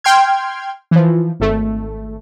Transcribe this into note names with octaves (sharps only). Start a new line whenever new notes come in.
G5 C6 F6 G#6
E3 F3
G#1 A3